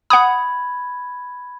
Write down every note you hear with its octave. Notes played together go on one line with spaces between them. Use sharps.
F#5 B5 D#6 G#6